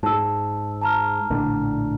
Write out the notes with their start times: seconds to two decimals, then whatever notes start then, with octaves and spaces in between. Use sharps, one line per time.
0.03 G#2 A5 E6
0.81 A5 A#5 F6
1.30 A#1 A2 D3